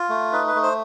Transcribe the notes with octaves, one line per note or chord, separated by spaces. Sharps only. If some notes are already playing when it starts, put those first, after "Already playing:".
Already playing: F4
A3
D#4 B4
B4
A3
C5